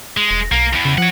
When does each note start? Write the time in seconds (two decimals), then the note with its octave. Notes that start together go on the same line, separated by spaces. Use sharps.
0.17 G#3
0.31 E1
0.52 B1 A#3
0.73 E2 E3
0.85 C#3
0.98 F3 C#5 F#5